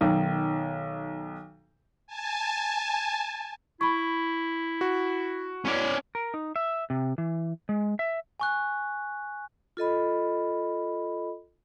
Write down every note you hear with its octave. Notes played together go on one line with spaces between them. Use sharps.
B1 D#3
G#5 A5
E4 B5 C#6
F#4
C#4 E4 D5
A#4
D#4
E5
C3
E3
G#3
E5
G#5 C#6 F#6
F4 A4 D#5 B5